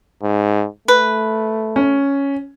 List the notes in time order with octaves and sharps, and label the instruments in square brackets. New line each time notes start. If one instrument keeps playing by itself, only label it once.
[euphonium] G#2
[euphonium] A3 [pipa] B4
[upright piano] C#4